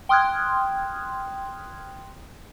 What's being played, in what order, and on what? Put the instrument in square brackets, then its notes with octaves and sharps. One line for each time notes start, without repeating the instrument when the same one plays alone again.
[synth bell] G5 C6 D#6 F6 F#6 G#6